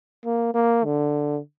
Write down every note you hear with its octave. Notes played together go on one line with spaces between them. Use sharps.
A#3
A#3
D3